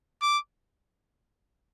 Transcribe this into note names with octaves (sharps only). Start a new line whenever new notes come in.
D6